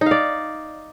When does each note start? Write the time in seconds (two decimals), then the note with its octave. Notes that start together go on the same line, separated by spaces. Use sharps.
0.01 D#4
0.06 F5
0.11 D5